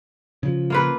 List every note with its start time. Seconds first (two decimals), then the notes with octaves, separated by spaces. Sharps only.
0.43 C#3 F3
0.70 A#3 F4 B4